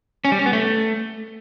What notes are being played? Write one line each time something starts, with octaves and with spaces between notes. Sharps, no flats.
C#4
G3
C#4
B3
A3